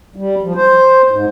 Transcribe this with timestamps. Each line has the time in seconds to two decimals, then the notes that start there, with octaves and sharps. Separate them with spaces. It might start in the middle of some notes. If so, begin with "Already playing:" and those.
0.16 G3
0.43 F3
0.55 C5
1.11 G#2